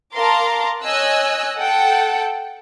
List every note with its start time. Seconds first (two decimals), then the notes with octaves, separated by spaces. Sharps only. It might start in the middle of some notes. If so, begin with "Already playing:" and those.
0.14 A#4 F5 A5 A#5 C6 D6
0.83 C#5 D#5 G#5 E6 F#6
1.56 A4 F#5 G5